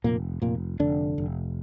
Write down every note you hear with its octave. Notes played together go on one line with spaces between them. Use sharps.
F1 A#2 A#3
F1 A#2 A#3
F1 D3 D4
F1